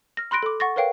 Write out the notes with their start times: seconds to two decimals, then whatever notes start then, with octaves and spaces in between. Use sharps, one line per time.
0.17 F6 A#6
0.31 B5 C6 F#6 A#6 D7
0.43 A4 D6
0.60 F#5 C#6 A6 A#6
0.76 A#4 B4 C#5 F5 G5